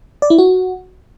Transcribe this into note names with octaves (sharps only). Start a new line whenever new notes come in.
D5
E4
F#4